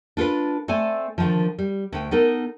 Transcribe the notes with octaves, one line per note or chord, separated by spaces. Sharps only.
D4 F4 A4 B4
A3 C4 A4 D5 G#5
D3 D#3 F3
G3
D2 G5
B3 D#4 A4 A#4